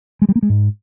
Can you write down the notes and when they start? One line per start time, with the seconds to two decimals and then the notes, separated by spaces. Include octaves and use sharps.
0.22 G#3
0.29 G3
0.36 A#3
0.43 G#3
0.49 G#2